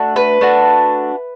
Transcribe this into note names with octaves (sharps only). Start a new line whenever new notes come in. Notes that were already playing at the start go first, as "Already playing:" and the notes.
Already playing: A3 D4 F#4
B4
A3 D4 F#4